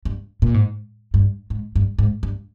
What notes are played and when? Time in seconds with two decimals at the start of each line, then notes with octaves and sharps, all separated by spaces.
0.05 G2
0.42 A#2
0.54 G#2
1.14 G2
1.50 G#2
1.76 G2
1.99 G#2
2.23 G2